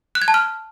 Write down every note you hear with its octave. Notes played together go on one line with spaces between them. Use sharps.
F#6
G#6
A5
F6